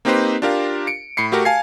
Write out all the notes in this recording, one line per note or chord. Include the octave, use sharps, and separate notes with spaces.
A#3 C4 D#4 G4 B4 C5
D4 F4 G4 A#4 F5
C#7 D7
A2 B5 C7 C#7
A3 F#4 G4 A#4
F5 G#5 A5 G#6 C7